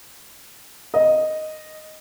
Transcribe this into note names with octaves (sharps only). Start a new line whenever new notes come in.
D#5